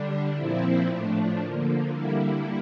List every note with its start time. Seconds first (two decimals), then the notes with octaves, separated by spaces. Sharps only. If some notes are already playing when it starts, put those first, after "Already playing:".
Already playing: D3 G3 D4
0.34 A#2 F3 C4 E4
0.87 A2 F3 A3 D4
1.39 D3 F3 A#3
1.92 D3 G3 A#3 E4